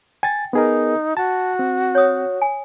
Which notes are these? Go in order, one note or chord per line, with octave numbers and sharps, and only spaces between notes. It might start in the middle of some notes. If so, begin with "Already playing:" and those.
G5 G#5 A6
B3 D#4 G#4 A#4
F#4 A5
C4
C#5 D#6
G#5